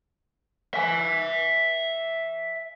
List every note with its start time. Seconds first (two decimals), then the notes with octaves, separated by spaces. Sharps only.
0.74 E5 G#5